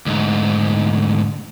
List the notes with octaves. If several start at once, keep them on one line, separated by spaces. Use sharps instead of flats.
D2 G#2